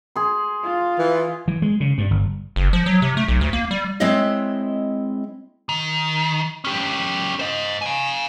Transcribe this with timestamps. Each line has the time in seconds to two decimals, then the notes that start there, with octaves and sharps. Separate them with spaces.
0.16 G#4 C6
0.64 F4
0.99 E3
1.48 E3
1.62 G#3
1.80 C#3
1.98 G2
2.11 G1
2.56 F#1
2.73 F3
2.86 F#3
3.02 C3
3.17 A3
3.28 B1
3.41 D2
3.53 A#3
3.71 G3
4.00 G#3 C4 E4 C#5 D#5 E5
5.69 D#3
6.65 C#4 G4
7.39 C5 D#5
7.82 F5 G#5